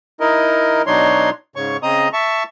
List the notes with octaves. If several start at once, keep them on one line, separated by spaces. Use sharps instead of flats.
D#4 E4 A#4 D#5
B2 F#3 D4 D#4 C#5 C6
G#2 C#3 C#5 C#6
C#3 C4 D#5 A#5 D#6
E5 A5 C#6